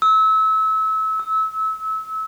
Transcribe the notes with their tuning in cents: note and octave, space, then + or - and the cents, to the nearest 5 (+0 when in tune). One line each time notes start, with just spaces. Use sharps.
E6 -30
E6 -25